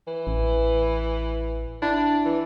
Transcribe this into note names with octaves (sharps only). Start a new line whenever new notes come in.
E3
A1
D4 E4
E3